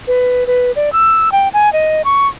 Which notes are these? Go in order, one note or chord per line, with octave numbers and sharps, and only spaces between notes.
B4
B4
D5
E6
G5
G#5
D#5
C#6